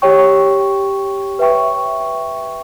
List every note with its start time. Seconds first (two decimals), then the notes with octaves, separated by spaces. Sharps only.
0.02 G4 C#5 G5 C#6
1.39 B4 E5 G5 C#6